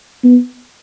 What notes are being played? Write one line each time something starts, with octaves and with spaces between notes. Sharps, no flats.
B3